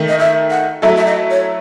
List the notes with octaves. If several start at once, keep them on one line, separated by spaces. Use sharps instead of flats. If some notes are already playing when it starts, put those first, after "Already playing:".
Already playing: D#3 A3 D#4
D#5
E5
F#5
F#3 A3 E4 A4 E5
E5
D#5
C#5